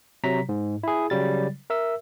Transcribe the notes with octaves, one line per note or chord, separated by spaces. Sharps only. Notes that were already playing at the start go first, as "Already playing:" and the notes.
C3 F#3 A#5 B6
G#2
E4 G#4
C#3 F#3 G3 A6
A#4 E5 E6